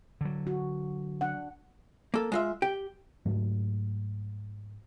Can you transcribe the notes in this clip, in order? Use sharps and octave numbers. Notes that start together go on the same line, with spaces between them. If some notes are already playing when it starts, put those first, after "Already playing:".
D3 F#3
F#4
D4 F#5
A#3 A4
G#3 F4 E5
G4 G5
G#2 F#3 A3